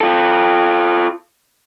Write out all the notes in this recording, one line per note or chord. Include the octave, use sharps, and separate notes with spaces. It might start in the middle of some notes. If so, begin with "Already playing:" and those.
F4 A4